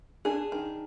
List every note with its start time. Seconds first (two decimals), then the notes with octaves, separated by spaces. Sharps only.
0.25 D4 G#4
0.52 D#3